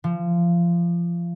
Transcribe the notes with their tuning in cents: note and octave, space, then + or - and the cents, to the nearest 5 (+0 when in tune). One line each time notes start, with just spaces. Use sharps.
F3 -25